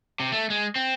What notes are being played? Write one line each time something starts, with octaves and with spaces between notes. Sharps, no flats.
C3
A3
G#3
C4